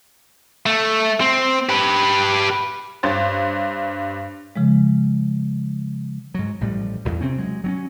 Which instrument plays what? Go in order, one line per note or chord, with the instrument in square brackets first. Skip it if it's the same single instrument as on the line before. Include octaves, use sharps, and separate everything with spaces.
[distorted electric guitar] A3
C4
G4 B4
[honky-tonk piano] G2 C5 C#5 A6
[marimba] C#3 F3 G#3
[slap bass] G#2 F#3
A1 A2 F3 G3
D1 E2
C3 C4 C#4
F#3 G#3
F#3 C4 C#4